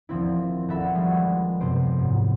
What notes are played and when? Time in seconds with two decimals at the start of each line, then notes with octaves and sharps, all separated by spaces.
0.09 D#1 F3 C4 E4
0.68 D#1 F#4 A4 E5 B5
0.95 F3 G3 G#3 F#4
1.60 F#2 C3 B3 C5 D7
1.99 G#2